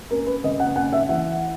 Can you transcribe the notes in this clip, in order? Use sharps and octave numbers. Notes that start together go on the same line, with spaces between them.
C#4 A#4
B4
C#3 D#5
F#5
C#4 F#5
E5
E3 F#5